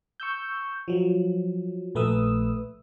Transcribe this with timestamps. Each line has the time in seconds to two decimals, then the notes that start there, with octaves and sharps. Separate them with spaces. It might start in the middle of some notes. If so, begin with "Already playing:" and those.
0.20 C#6 E6 G6
0.88 F3 F#3
1.95 A#1 A3 B4 D#6 E6